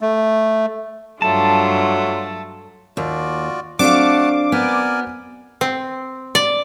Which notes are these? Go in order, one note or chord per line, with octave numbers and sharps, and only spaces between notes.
A3
G2 F#3 A3 D4 F4 A5
D#2 F4 F#4 D5
F#3 A3 C4 D4 F5 F#5 A5 D6
B3 A#4 D5 G#5
C4
D5